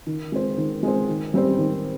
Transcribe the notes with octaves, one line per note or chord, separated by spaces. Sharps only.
D#3
G#3 C4 F4 C5
D#3
G#3 C4 F4 C5
D#3
G3 C4 G4 C5
D#3